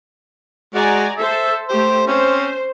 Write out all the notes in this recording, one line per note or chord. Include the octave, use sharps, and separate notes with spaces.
G#3 F#4 D5 G#5 A#5
A4 C5 E5
A3 G4 C5
C4 C#4 C5